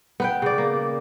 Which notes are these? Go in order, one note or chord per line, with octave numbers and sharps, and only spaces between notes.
B3 B4 G5
C#3 D5
A#3